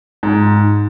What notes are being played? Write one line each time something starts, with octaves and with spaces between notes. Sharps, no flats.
G#2